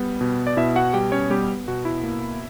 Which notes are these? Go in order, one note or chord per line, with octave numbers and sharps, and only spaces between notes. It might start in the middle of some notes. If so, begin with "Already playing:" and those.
Already playing: G3 B3
B2
D5
B2 E4 E5
F#4 F#5
G3 G4 G5
C#4 C#5
G3 B3 G4
B2 F#4
E4
A#3